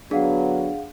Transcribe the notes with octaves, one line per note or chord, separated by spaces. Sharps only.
D3 F#3 B3 D4 G#4 F5 F#5